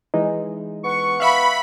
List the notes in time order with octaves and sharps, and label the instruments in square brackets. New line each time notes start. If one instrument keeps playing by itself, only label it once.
[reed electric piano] E3 G#3 D#4
[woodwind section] B3 F#5 C#6
[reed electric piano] E5 F5 [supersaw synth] B5